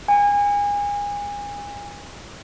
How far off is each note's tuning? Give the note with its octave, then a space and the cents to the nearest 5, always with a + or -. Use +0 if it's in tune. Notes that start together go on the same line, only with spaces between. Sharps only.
G#5 -30